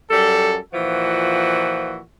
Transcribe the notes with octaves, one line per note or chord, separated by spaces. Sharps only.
F#2 G3 A4
A#2 E3 F3 F#4